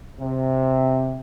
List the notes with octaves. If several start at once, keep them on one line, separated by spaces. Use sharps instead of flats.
C3